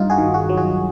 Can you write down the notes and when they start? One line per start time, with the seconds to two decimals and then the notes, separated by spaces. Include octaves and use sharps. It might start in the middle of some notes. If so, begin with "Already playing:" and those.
Already playing: G2 D#4 F4
0.10 F#4 G#4
0.18 D#3
0.34 F#4 G#4
0.49 F#3
0.57 F#4 G#4